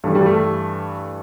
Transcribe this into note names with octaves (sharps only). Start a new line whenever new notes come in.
G2 E3 A3
G3
A3